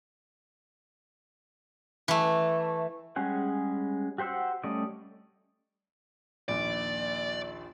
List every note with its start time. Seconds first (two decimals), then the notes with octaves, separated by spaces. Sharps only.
2.08 E3 A3
3.16 G3 G#3 C#4 G#4 F#5
4.18 F#4 G4 C5 F#5 E6
4.63 G3 A3 C#4 D5 D#5
6.48 A#1 D#2 D5